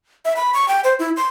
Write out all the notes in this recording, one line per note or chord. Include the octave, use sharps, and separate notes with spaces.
E5
B5
C#6
G5
C5
E4
C6